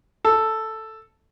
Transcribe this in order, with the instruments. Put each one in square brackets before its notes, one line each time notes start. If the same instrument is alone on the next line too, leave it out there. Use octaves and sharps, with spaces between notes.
[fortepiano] A4